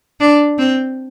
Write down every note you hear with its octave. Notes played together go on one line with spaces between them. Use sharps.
D4
C4